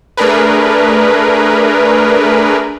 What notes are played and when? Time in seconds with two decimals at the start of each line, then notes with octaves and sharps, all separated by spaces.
0.17 A3 D4 G#4 A#4 B4